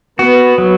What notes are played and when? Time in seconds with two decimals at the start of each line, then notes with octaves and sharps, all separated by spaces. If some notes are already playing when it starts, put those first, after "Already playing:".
0.19 B3 F#4
0.58 F#3